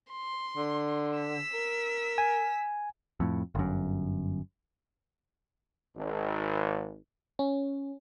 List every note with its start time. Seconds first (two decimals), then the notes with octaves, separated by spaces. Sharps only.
0.11 C6
0.57 D3
1.19 E6 B6
1.54 A#4
2.18 G#5
3.20 F2 A2
3.55 G1 F#2
5.96 G#1
7.39 C#4